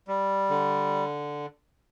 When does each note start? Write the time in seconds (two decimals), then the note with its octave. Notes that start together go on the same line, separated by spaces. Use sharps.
0.08 G3
0.50 D3